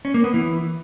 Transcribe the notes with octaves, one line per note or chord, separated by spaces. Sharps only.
C#4
A#3
B3
E3